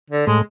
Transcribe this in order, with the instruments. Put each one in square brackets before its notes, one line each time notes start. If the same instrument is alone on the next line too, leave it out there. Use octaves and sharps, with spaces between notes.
[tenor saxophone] D3
[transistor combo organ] A2 [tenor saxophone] G#3